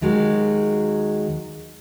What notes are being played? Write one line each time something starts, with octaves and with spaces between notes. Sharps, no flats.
D#2 D#3 F#3 G#3